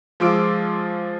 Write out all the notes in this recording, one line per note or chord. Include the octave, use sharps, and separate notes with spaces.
F3 G#3 F4 D6 E6 D7